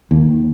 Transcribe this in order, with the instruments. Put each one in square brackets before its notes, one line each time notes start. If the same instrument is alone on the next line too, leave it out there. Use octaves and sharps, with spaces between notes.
[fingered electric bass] D#2